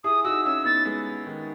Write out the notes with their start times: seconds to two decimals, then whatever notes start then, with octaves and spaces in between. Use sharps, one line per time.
0.04 E4 G#4 D#6
0.24 D#4 F#4 E6
0.45 C#4 E4 E6
0.65 B3 D#4 A6
0.85 G#3 B3
1.27 D#3